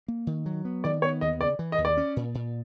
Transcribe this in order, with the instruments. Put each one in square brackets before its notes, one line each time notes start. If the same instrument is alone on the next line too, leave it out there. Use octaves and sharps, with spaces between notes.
[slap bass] A#3
D#3
F#3
B3
[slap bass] D#3 [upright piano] D5
[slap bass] B3 [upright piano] C#5
[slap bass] D#2 [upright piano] D#5
[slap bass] C#3 [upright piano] D5
[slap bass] E3
[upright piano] D#5
[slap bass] D#2
[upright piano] D5
[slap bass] C#4
A#2
A#2